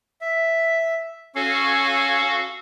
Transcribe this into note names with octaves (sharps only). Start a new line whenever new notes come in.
E5
C#4 F#4 A4 F5 G#5